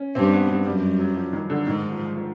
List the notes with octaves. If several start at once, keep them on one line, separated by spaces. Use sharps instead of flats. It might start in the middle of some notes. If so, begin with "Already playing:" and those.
Already playing: C#4
G2 C4
B3
F#2 G3
F#3
F3
D#3
D3
G#2 D#3
F3
F3